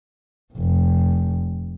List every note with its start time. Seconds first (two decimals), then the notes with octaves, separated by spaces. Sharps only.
0.54 F1 F2